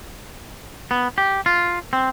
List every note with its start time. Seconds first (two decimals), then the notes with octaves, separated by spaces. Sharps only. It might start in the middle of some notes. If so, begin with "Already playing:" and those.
0.91 B3
1.18 G4
1.46 F4
1.93 C4